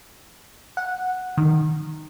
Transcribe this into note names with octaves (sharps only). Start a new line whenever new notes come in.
F#5
D#3